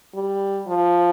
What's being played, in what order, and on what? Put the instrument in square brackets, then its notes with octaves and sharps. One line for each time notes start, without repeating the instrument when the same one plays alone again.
[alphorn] G3
F3